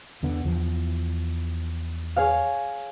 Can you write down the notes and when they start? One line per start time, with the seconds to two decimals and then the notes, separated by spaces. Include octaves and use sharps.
0.23 E2 D3 B3
0.45 E2 F3
2.16 G#4 C#5 F5